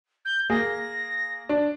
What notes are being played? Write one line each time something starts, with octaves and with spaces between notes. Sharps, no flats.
G6
A#3 G#4 A#6
D4